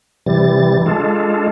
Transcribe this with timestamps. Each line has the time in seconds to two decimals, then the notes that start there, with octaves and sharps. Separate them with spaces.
0.26 C3 E3 G3 A6
0.86 G#3 D4 F4 A4